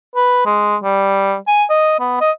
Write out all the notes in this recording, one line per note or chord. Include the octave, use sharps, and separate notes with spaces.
B4
G#3
G3
G#5
D#5
B3
D#5